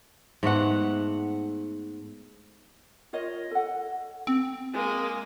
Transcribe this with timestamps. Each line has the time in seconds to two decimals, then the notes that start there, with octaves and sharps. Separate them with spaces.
0.43 G#2 A3 B3 F#5
3.13 F4 A#4 C#5 D#5
3.51 A4 F#5
4.27 C4
4.73 G#3 A#3